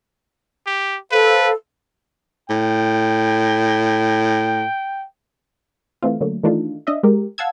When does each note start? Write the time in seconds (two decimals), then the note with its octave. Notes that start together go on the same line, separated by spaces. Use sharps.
0.67 G4
1.12 A4 B4 C5 F5
2.50 A2 G5
6.02 E3 A3 C4 F4
6.21 D3 F#3 A3 A#3
6.43 D#3 E3 A3 D4 D#4 F4
6.87 D4 D#5 E5
7.03 G#3 G4 A#4
7.38 F5 F#5 A5 E6 G#6